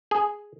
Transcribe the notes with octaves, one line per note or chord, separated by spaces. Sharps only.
G#4